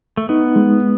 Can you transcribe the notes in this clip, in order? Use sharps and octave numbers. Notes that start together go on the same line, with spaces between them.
A3
B3 D#4
G#3